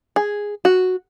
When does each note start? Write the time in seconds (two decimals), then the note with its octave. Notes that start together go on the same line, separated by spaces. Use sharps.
0.16 G#4
0.65 F#4